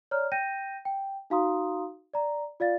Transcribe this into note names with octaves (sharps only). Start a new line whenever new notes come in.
C#5 D5 A#5 F6
G5 G6 A#6 D#7
G5
D#4 F#4 F5 A#5 C6 D#6
D5 A#5
F4 D5 F5 A6